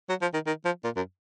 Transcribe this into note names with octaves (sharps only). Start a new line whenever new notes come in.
F#3
F3
D#3
D#3
F3
A#2
F#2